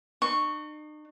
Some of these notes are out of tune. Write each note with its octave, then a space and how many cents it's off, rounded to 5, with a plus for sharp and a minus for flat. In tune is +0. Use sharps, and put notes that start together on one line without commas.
D#4 -45 C#6 +0